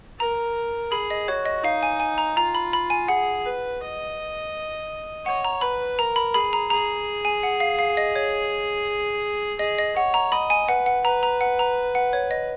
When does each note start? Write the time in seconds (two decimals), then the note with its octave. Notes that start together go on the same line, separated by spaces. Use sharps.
0.20 A#4 A#5
0.91 G#4 B5
1.11 D#5
1.28 F#4 C#5
1.45 D#5
1.64 D#4 F5
1.83 G#5
2.00 G#5
2.18 A#5
2.36 F4 A#5
2.55 B5
2.73 B5
2.90 G#5
3.08 G#4 F#5
3.45 B4
3.81 D#5
5.25 C#5 F#5
5.45 A#5
5.61 B4 B5
5.99 A#4 A#5
6.16 B5
6.34 G#4 B5
6.53 A#5
6.70 G#4 A#5
7.25 G#5
7.43 F#5
7.60 F5
7.79 F5
7.97 D#5
8.16 C#5
9.59 G#4 D#5
9.78 D#5
9.96 C#5 F#5
10.14 A#5
10.32 D#5 B5
10.50 G#5
10.68 B4 F#5
10.86 F#5
11.05 B4 A#5
11.23 A#5
11.41 F#5
11.59 A#5
11.95 F#5
12.13 C#5
12.31 D#5